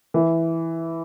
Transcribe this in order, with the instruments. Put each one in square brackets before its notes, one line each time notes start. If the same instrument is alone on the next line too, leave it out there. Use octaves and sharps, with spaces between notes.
[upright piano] E3